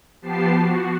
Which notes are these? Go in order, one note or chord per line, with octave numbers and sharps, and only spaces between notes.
F3 B3 G4 A5 C7
F#4